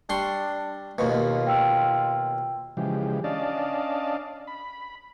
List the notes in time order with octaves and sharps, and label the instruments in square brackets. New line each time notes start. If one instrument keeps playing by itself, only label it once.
[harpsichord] G3 C6 C#6 [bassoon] D4
[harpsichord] D#2 B2 [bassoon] F4
[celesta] G5 E6
[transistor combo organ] C#3 E3 F3 G#3 G4
C#4 D4 D5 D#5 F5 A5
B5